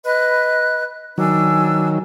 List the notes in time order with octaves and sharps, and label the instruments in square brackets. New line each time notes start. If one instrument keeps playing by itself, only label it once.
[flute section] B4 D#5 F#6
[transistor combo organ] D#3 F#3 [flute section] D4 G#5 E6